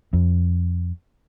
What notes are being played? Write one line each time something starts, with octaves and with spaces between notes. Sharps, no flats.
F2